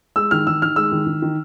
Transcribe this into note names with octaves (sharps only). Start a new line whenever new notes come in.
G#3 E6
D#3 F6
D#3 E6
D#3 F6
G#3 E6
D#3
D#3
D#3